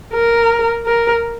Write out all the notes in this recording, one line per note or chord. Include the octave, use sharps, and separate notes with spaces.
A#4
A#4